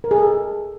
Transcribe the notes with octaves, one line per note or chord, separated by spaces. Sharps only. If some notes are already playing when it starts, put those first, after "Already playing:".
A#4
G#4
A4